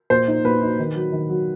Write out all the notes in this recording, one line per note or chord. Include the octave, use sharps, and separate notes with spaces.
A#2 C5
D#4
A#2 B4
D#4
D#3
F#3
D#3
F#3